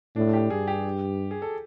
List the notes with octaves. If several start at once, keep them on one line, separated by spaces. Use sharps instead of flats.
A2 D4
G4
G2 G#4
G4
G#4
A4